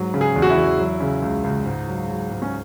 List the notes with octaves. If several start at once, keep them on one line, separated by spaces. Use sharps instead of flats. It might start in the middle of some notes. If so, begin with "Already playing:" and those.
Already playing: G#2 F#3
C#3
G#4
E2
F#4
E4
E2
F#3
C#3
C#2
C#2
G#2
F#3
F#3
G#2
C#4